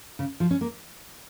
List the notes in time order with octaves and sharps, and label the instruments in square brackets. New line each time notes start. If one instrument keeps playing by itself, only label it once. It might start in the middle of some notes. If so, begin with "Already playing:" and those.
[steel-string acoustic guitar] C#3
F3
C#4
A#3